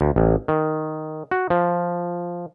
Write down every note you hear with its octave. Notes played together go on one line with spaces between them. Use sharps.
D2
A1
D#3
F#4
F3